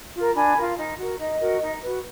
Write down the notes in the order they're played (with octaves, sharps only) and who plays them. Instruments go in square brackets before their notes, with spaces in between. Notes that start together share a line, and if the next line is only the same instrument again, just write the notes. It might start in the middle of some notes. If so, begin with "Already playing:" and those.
[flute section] F4 A#4
D4 G#5 B5
F4 A#4
D#4
F#4 A#4
D#4 D#5
F#4 A#4
D#4
F#4 B4